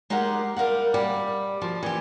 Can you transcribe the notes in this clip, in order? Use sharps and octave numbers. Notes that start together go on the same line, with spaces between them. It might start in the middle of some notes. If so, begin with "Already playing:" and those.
G#3 D#4 G4 A#4 F#5
G3 A#4 F5 F#5
G3
F3
E3 G4